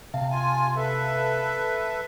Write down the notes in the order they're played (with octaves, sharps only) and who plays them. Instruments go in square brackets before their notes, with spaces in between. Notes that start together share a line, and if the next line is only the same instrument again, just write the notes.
[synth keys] C3 F5 A5
[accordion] F4 G#5
A4 B4 E5